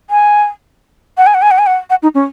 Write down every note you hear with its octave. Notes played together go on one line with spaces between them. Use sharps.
G#5
F#5
G#5
F#5
G#5
F#5
G#5
F#5
F#5
D#4
C#4